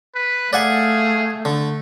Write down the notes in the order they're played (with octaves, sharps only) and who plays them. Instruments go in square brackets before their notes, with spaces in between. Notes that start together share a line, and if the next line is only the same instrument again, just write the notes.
[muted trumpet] B4
[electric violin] A3 [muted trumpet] G#4 [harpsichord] D5 F#5 G#5 [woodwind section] F5
[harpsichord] D3 [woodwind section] A3